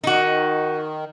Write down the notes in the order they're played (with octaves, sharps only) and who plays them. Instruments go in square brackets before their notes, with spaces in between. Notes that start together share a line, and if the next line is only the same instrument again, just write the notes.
[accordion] D#3 [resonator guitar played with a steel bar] D#4 F#4